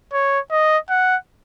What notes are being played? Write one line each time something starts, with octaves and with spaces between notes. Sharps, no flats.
C#5
D#5
F#5